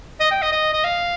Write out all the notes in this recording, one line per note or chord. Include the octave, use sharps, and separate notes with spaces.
D#5
G5
D#5
D#5
D#5
F5